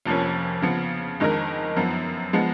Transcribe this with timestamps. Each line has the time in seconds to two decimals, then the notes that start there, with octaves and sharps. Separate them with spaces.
0.06 F1 F2 F3 A#3 C#4
0.62 C#3 F3 B3
1.20 F2 D#3 G#3 D#4 A#4
1.76 F#2 F3 B3
2.33 F3 G#3 B3